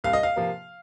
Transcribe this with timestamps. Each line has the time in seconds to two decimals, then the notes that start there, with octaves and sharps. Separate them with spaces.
0.04 C2 F5
0.13 D#5
0.23 F5
0.36 C3 F3 A#3